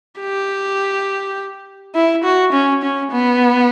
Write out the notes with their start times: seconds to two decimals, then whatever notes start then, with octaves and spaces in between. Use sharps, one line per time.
0.20 G4
1.95 E4
2.24 F#4
2.53 C#4
2.82 C#4
3.12 B3